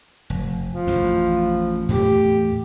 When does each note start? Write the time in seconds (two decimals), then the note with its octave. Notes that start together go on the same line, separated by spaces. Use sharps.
0.30 F1
0.69 F3
0.87 A1 F2
1.89 E2 A2 A3 G4